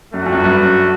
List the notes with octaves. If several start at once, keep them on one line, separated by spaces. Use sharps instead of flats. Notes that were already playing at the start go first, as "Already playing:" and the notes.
F#2 A3 D4 F#4
F2
F#2
G2
F#2
G2
F#2